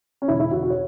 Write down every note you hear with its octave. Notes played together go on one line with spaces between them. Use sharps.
C#4
E1 E4
E4
E2 B2 F#4
F#4
C#5